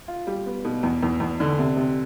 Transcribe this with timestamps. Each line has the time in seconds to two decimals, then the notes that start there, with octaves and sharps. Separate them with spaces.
0.08 F4
0.27 G3
0.46 B3
0.65 B2
0.83 E2
1.03 E2
1.20 E2
1.40 D3
1.59 C3
1.77 C3